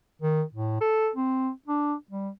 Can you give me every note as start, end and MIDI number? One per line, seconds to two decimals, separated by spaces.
0.21 0.42 51
0.54 0.76 45
0.81 1.09 69
1.16 1.50 60
1.67 1.94 62
2.11 2.29 55